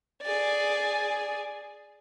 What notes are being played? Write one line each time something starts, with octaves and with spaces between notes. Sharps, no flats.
G#4 D5